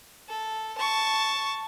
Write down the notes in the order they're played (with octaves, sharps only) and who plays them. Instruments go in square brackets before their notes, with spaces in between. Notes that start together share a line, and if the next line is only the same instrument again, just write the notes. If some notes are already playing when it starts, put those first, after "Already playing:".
[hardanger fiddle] A4
A5 C#6